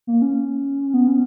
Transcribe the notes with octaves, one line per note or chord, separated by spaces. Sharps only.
A#3
C#4
B3
C#4